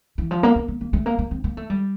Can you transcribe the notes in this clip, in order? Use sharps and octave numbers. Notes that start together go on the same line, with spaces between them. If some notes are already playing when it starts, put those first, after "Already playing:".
E3
F3
A#3
A#3
A#3
A#3
A3
A#3
A#3
C4
A#3
A3
G3